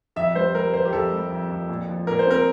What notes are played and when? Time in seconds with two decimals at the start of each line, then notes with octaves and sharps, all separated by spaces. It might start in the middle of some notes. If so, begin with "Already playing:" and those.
0.16 F2 E5
0.35 G3 C5
0.55 G3 A#4
0.73 F2 C5
0.85 G4
0.93 F2 A4
1.12 G3
1.31 F2
1.50 F2
1.69 A#2
1.88 F3
2.07 A#2 A#4
2.19 C5
2.27 C4 A#4